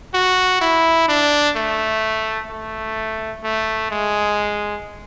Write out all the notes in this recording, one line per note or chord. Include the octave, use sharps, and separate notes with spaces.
F#4
E4
D4
A3
A3
A3
G#3